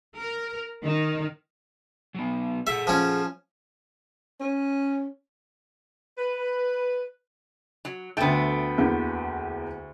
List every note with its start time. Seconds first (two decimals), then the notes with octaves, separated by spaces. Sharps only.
0.18 A#4
0.82 D#3
2.15 F#3 B3
2.67 G#4 A4 E5 F#5
2.87 F3 C#4
4.41 C#4
6.18 B4
7.85 F#3
8.17 D2 A3 B3 G5
8.78 E2 A#3 G6